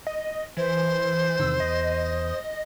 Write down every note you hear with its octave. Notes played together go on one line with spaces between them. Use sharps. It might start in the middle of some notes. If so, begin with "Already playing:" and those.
D#5
E3 C5
E2 C3 D#3 E6
E2 D#5